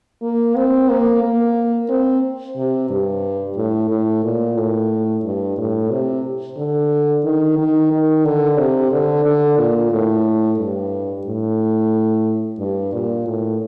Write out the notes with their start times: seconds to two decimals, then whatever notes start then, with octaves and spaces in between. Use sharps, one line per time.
0.22 A#3
0.56 C4
0.89 A#3
1.22 A#3
1.89 C4
2.57 C3
2.90 G2
3.57 A2
3.90 A2
4.24 A#2
4.57 A2
5.24 G2
5.58 A2
5.91 C3
6.57 D3
7.24 D#3
7.58 D#3
7.92 D#3
8.25 D3
8.58 C3
8.92 D3
9.25 D3
9.58 A#2
9.93 A2
10.59 G2
11.27 A2
12.59 G2
12.93 A#2
13.27 A2